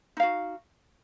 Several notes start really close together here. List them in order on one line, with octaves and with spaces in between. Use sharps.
D#4 F5 F#4